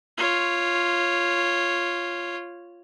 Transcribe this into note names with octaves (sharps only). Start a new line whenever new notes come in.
F4 C#5